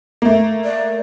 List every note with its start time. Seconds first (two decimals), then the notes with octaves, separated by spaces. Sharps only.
0.22 A3 A#3
0.64 D5